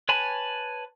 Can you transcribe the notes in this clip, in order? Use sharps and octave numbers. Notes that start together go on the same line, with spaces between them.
B4 C#5 G#5 A5 B5